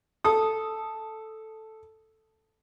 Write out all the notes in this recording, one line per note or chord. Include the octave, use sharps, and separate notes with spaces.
A4 D#6